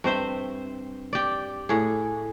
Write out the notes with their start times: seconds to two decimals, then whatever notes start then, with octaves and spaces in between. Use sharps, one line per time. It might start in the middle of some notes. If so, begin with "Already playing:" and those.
0.04 G2 C4 C5 E5
1.13 G4 D5
1.69 A2 G#4